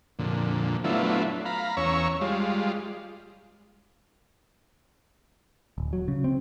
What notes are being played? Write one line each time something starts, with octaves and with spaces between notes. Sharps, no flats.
F2 A#2 D3
F#3 A3 B3 D4 E4 F4
F5 A#5 B5
E2 C#4 C#5 A#5 C#6 E6
G3 G#3 F4
D1
F#3
C#3
C4